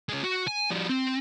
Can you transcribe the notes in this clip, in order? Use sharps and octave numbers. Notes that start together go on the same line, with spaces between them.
C#3 G#3
F#4
G#5
F3 G3
C4